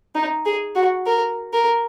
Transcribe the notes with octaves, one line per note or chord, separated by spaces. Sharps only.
D#4
G#4
F#4
A#4
A#4